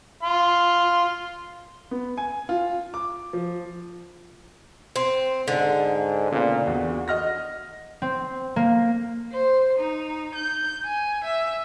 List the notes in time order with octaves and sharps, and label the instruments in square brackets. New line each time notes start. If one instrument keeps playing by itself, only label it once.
[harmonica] F5 C6
[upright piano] B3
G#5
F4
D6
F3
[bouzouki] C4
[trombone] G#2 [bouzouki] D3
[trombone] A#2 [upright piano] C#3 B3
[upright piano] E2 [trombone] F#4
[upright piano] D#5 F6 A#6
[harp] C4
A#3
[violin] C5
D#4
G6
G#5
E5